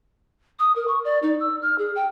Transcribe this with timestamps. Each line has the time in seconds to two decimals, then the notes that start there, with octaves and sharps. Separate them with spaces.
0.59 D#6
0.76 A#4
0.88 C#6
1.04 D5
1.22 D#4
1.40 E6
1.62 F6
1.78 G#4
1.95 G5